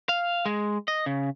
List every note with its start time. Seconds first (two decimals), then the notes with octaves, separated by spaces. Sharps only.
0.09 F5
0.46 G#3
0.88 D#5
1.06 C#3